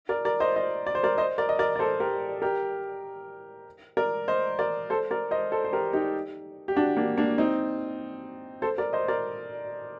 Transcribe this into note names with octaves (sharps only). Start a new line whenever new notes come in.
A#4 D5
A#4 D5
C5 D#5
C5 D#5
D5
C5
A#4 D5
C5 D#5
A#4 D5
D#5
A#4 D5
D5
A4 C5
G4 A#4
G4 A#4
A#4 D5
C5 D#5
A#4 D5
A4 C5
A#4 D5
C5 D#5
A4 C5
C5
G4 A#4
D#4 G4
G4
D4 F#4
A#3 D4
A#3 D4
C4 D#4
A4 C5
A#4 D5
C5 D#5
A#4 D5